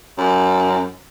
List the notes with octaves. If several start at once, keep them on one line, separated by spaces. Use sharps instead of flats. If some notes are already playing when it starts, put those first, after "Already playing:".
F#2